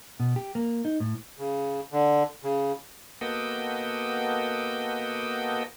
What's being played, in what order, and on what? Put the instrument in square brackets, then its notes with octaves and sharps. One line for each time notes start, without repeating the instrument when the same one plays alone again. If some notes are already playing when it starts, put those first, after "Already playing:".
[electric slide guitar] B2
G4
A#3
D#4
A2
[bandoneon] C#3
D3
C#3
[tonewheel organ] A#3 B3 F#4 A4 D#5 G5